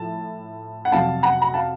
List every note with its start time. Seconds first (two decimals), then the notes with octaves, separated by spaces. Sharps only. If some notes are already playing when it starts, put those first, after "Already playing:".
Already playing: A2 F3 A5
0.85 F#5
0.92 F2 C3 F#3 F5 A5
1.23 F#5 A#5
1.42 A#5
1.54 F5 A5